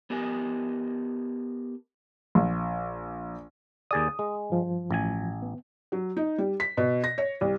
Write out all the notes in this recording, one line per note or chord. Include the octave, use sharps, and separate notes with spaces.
B3 G4 A#4 G#5
A#1
D#2 G#4 D5 D#6
G#3
G2 F3
A1 G#5
B3
F#3
D#4
G3
B6
B2
A#6
C#5
C2